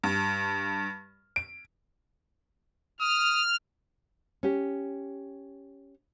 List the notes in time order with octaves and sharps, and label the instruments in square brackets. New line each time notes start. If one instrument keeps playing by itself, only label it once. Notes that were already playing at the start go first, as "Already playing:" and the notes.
[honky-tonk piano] G2
D7
[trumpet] D#6 [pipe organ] F6
[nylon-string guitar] C#4 G4